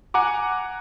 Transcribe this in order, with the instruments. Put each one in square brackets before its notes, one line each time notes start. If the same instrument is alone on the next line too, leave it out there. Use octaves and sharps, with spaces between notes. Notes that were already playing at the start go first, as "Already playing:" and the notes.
[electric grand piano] F#5 G#5 A#5 D6